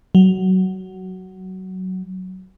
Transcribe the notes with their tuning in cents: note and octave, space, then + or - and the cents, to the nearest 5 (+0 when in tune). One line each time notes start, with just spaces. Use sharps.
F#3 +15